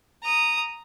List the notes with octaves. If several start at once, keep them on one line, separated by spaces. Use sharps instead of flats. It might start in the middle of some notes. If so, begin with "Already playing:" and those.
A#5 D#6